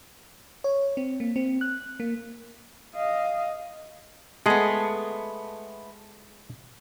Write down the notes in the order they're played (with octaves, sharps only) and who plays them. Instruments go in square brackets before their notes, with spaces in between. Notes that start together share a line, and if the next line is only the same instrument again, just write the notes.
[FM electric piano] C#5
C4
A#3
C4
F#6
A#3
[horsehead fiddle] D#5 F5
[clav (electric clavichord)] G#3 G#4 [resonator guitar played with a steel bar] A3 B3